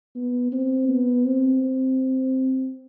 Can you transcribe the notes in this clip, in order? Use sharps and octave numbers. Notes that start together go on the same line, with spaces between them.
B3
C4
B3
C4